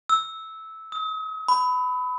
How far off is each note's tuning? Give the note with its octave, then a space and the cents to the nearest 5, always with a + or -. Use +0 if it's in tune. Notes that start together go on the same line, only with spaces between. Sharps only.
E6 -10
D#6 +40
B5 +20